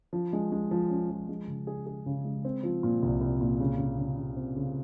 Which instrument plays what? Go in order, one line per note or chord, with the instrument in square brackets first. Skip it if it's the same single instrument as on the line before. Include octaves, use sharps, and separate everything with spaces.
[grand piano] F3
G#3
G#3
F3
C#4
F3
G#3
C#3
G#4
G#4
C#3
G#3
C4
F3
A#2
C2
C2
A#2
C#3
C#3
C#3
C#3
C4
C#3